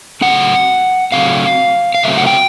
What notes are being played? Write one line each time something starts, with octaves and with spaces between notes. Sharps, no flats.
C#3 F#3 A3 C4 F#5
C#3 F#3 A3 C4 F5
F5
C#3 F#3 A3 C4 E5
F#5
G5